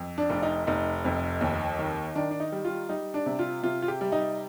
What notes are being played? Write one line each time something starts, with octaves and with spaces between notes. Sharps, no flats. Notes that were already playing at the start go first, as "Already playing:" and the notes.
Already playing: F2
D4
F1 D4
D#4
F1 D#4
F2
D#2
D#3
D#3 D4
D4
D#4
G3
F4
G3 D#4
D4
C3
F4
C3 F4
F4
G4
G3
D#4